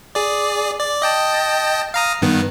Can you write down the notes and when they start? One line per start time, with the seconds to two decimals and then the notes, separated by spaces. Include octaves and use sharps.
0.15 G#4 D5
0.80 D5
1.02 D#5 G5 A5
1.94 F5 A#5 D#6
2.22 G2 D#3 B3